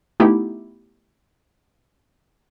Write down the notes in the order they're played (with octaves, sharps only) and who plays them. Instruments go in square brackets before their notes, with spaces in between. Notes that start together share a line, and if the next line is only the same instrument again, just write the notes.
[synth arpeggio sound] A3 B3 D#4 E4 G4